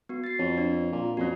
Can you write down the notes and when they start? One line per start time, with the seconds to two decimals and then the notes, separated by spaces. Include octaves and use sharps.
0.09 B3 F#4
0.24 A6 C7
0.39 F2 C#5
0.58 D4
0.92 A#2
1.17 F2 C#4 F#4